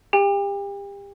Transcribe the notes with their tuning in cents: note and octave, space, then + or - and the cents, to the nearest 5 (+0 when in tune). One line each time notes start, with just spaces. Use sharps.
G4 +30 G5 +40